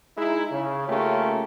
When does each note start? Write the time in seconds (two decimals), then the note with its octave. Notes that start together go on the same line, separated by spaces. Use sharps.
0.17 G#3 D#4 E4
0.51 C#3
0.88 C#3 A3 A#3 C#4 F4 G4